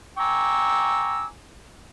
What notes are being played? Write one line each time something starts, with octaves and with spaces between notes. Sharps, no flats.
G5 G#5 A#5 C#6 D6 E6